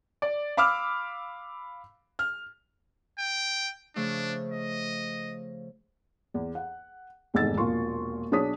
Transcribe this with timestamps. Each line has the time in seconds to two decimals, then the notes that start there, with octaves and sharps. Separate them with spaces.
0.22 D5
0.57 F5 B5 D6 E6 F6
2.19 F6
3.19 G5
3.96 C#3 F3 A3 D4
4.52 D#5
6.34 E2
6.55 F#5
7.34 F1 E2 G#2 D#3 E6 A6
7.57 E1 A#1 F4 C6 C#6
8.31 B1 D4 G#4 C#5 D#6 B6